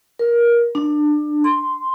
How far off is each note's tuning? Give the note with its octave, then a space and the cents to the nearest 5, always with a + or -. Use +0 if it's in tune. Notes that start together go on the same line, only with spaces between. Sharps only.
A#4 +20
D4 +25
C6 -5